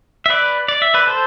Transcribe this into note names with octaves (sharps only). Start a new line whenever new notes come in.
E5
B4 D5
D5
E5
B4 D5
A4 C5